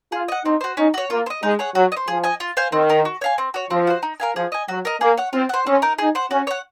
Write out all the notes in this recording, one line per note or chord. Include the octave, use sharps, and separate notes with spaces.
F4 G#4
D#5 F#5
C4 D#4
F#4 C5
C#4 D#4
F#4 C#5
A#3 F4
C5
D#5
G#3 D#4
G#4 C#5 F#5
F#3 F#4
D#5
C5
F3 G#4
D#5 G#5
F4
C5 F5 G#5
D#3 C4
D#4 A#4
F#4
C#5 F5 G#5
C4
F#4 C#5
F3 C4
F#4 C5
D#4
A#4 F5 G#5
F3 G#4
D#5 G#5
F#3 F#4
A#4 D#5
A#3 G#4
C#5 F#5
C4 F4
C5 F#5
C4 C#4
D#4 A#4
D#4 G#4
C5 F#5
C#4 F#4
C#5 F#5